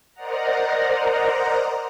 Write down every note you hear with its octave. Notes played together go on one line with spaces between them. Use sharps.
A#4 C5 D5 D#5 F#5 A#5